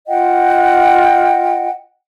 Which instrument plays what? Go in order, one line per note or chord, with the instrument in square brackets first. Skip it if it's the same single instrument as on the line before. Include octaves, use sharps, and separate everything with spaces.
[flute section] F4 D#5 F#5 G5